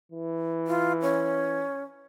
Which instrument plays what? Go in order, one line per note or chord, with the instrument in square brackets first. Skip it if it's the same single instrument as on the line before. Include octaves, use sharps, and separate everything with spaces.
[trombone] E3
[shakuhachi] F4
C#4